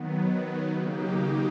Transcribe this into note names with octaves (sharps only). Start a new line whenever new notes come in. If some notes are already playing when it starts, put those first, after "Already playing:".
Already playing: D#3 F#3 B3
C#3 F#3 A#3 D#4 G4